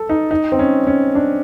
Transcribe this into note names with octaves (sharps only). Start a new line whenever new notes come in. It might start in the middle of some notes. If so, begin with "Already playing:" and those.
Already playing: A4
D#4
D#4
C4
C#4
C#4
D4